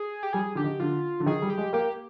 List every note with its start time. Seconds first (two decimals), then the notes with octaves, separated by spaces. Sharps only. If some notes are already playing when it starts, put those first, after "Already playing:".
Already playing: G#4
0.23 G4
0.33 G3 G#4
0.55 D3 G4
0.64 D#3
0.80 D3 F4
1.20 D3
1.26 D#3 G#4
1.42 G3
1.50 G4
1.58 G#3
1.73 A#3 G4